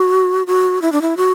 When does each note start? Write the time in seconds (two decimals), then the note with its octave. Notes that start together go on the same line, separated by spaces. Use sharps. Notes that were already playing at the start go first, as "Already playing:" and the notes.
Already playing: F#4
0.47 F#4
0.82 E4
0.92 D4
1.02 E4
1.17 F#4